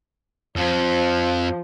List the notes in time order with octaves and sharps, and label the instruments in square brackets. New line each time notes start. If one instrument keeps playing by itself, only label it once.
[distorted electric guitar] F2 [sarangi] F3